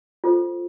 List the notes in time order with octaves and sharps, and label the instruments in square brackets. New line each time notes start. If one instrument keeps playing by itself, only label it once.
[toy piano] F4 A4 C5